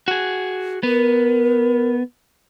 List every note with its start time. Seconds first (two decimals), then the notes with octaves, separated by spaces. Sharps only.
0.08 F#4 G#4
0.83 B3 A#4